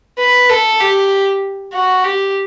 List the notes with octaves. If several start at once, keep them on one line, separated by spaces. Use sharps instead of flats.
B4
A4
G4
F#4
G4